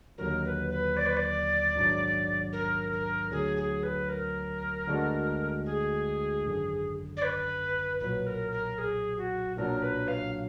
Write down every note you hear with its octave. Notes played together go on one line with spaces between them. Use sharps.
D#2 D3 F#3 A#4
B4
B4
D5
B4
D5
A#1 G#2 D#3 F#3 D4
A#4
A#4
D2 D3 F#3 G#4
G#4
B4
A#4
D2 D3 G#3 D4 F#4
G#4
G#1 F#2 D3
D5
B4
B1 A#2 F#3 B4
A#4
A#4
G#4
F#4
B1 A#2 F#3 D4 A#4
B4
F5